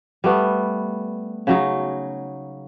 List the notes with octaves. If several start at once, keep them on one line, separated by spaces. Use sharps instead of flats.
G3 A3 B3
C#3 F#3 D#4